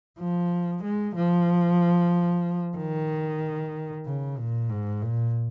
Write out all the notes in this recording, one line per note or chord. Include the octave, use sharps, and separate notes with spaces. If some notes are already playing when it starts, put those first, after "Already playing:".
F3
G#3
F3
D#3
C#3
A#2
G#2
A#2